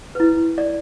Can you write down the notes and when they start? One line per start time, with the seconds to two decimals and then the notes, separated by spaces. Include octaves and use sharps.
0.15 E4 B4
0.58 D5